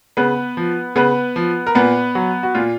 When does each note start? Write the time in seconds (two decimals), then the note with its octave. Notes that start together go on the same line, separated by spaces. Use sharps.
0.17 C#3 B3 B4
0.57 F3
0.96 C#3 B3 B4
1.36 F3
1.67 A#4
1.75 A#2 B3 B4
2.15 F#3
2.43 F#4
2.55 A#2 F4